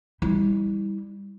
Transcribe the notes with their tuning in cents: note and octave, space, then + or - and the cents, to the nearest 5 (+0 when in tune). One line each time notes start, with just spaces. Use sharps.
G3 +15 E4 -30